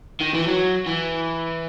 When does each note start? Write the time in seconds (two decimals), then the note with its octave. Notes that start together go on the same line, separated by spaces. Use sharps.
0.21 D#3
0.34 E3
0.48 F#3
0.86 E3